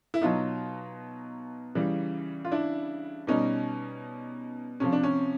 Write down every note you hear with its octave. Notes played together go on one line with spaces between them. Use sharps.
E4
B2 F#3 D#4 F4
C#3 E3 G3
F4
D4 E4
B2 G3 C#4 D#4
C3 F3 C#4
D4
C#4